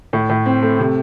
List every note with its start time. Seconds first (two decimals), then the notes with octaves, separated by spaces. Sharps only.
0.13 A2
0.29 A2
0.46 C4
0.62 A3
0.79 C3